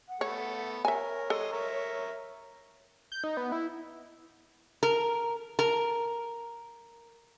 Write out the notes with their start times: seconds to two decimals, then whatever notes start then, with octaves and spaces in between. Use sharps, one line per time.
0.09 F#5
0.21 A3 B3 C#5
0.85 A#4 C#5 E5 G#5
1.30 A4 D#5 C6 D#6
1.52 A#4 E5 C#6
3.12 G6
3.24 D#4
3.37 B3
3.52 E4
4.83 A#4
5.59 A#4